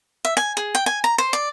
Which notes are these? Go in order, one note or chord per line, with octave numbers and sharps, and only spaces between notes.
E5
G#5
G#4
G5
G#5
A#5
C5
D5